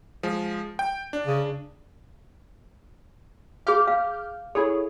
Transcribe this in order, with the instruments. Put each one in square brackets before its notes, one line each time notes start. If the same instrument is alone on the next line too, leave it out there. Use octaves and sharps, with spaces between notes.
[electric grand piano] F3 G#3
G5
D4
[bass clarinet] C#3
[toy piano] G#4 F5 [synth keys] D6 F6 G6
[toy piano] F5
[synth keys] E4 G#4 C#5 [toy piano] A4